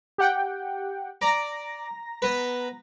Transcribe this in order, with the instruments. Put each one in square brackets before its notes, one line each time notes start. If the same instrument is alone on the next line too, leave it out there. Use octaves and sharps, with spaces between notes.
[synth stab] G4 F#5 G5
[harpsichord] D5 [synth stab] A#5 A#6
[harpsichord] B3 B4